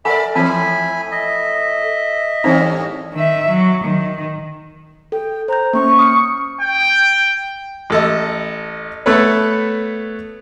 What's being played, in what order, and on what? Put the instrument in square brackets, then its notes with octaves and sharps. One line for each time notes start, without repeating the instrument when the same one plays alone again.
[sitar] A4 A#4 D5 [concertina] E5 B5 [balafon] F#5 G#5
[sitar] A2 E3 [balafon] F3 C4 [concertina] E5 G#5 B5
[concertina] D#5 E5
[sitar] G#2 G3 C#4 [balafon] E3 C4 D#4
[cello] D#3 E5
F#3
D#3
[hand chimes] A4 [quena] G5
[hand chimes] C5 G6 [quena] A#5
[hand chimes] A#3 C#4 [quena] C#6
[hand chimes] D#6 F6 C#7
[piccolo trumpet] G5
[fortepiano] A1 A4 D#5
A3 B3 A4 B4 C#5